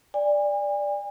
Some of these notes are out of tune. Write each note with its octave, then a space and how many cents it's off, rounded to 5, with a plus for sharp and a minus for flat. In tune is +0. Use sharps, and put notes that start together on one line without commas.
D5 +0 G#5 -40